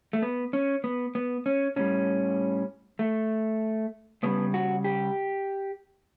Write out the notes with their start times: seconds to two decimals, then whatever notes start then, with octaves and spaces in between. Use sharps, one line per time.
0.13 A3
0.22 B3
0.53 C#4
0.84 B3
1.15 B3
1.46 C#4
1.76 A2 G3 C#4
2.99 A3
4.23 C#3 G3 B3
4.54 F#4
4.84 G4